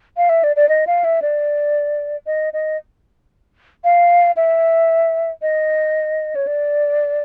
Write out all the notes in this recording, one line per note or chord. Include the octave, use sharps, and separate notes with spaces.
F5
E5
D5
D5
D#5
F5
E5
D5
D#5
D#5
F5
E5
D#5
C#5
D5